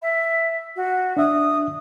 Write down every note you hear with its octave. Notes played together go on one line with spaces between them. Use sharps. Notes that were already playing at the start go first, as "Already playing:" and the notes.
E5
F#4
D4 E5 D#6